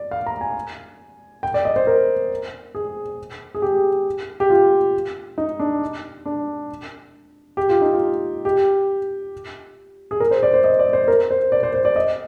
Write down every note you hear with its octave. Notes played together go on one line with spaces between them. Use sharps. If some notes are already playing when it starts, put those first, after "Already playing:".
Already playing: D5
F5
A#5
G#5
G5
D5
D#5
C5
A#4
G#4
G#4
G4
G4
F4
D#4
D4
D4
G4
F4
D#4
F4
G4
G#4
A#4
C5
D5
C5
D#5
D5
C5
A#4
C5
D5
C5
C5
D5
D#5